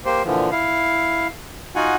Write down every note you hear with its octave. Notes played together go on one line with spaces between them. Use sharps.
A#3 G4 C5
A#2 D3 E3 F3
E4 F5
D#4 F4 F#4 F#5 G#5